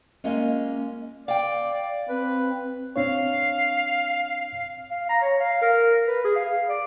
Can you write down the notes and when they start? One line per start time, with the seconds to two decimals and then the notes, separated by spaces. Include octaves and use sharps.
0.24 G#3 A#3 C#4 F4 D#5 F5
1.28 D5 F5 G5
1.87 D5
2.09 C4 B4
2.96 C4 D4 C#5 F5
4.91 F5
5.09 A#5
5.22 C#5
5.40 F5
5.62 A#4
6.07 B4
6.25 G#4
6.36 F5
6.69 D5